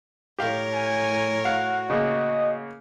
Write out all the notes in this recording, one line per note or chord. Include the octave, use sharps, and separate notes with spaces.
A2 G4 A#4 C#5 F5
G#5
F#4 F5 F#5
C#3 A#3 D#5